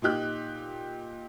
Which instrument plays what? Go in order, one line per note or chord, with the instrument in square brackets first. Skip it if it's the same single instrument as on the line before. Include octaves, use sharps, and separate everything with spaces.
[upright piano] A#2 D#4 G4 F#6